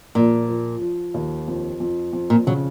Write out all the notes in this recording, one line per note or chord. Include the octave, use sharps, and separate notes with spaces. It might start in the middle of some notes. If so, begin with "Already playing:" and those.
A#2 F3
F3
F3
D#2
F2
F2
F2
A#2
C#3 F#3